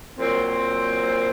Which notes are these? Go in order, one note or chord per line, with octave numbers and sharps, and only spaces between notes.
A#2 F#3 C4